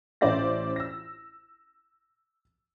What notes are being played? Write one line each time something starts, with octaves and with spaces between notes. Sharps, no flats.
A1 C#4 C5 D5 E5 A#6
E6 A#6